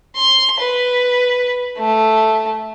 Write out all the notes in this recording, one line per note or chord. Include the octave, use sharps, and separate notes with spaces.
C6
B4
A3